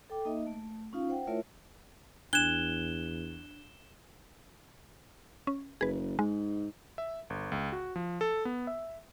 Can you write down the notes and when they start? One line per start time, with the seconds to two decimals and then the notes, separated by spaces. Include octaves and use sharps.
0.10 A4 G5 D6
0.25 A#3 D#4 D#5 E5
0.47 A3
0.93 C#4 D#4 F4 F5
1.09 C5 F#5 G5
1.27 A3 E4 F4 A#4 C#5 E5
2.33 E2 D4 F#6 G#6 E7 G7
5.47 C#4
5.81 F#1 G#4 B4
6.19 G#2 G#3
6.98 E5
7.30 G1
7.52 C#2
7.72 F#4
7.96 F3
8.21 A4
8.45 B3
8.67 E5